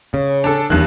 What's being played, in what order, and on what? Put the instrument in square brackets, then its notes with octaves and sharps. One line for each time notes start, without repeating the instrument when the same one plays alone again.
[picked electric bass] C#3
[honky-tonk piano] D4 A4
[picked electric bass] E2 D#3 [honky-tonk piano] G2 F#6